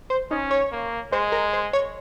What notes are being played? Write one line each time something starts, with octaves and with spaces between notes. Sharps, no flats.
C5
C#4 D#4
C#5
A#3
G#3 C5
A#4
C5
C#5